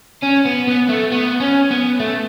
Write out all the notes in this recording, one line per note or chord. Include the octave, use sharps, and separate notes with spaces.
C#4
B3
B3
A3
B3
C#4
B3
A3